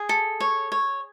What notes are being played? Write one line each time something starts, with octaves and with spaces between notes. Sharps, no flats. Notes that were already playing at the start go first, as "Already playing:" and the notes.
Already playing: G#4 G#5
A4
C#5
C#5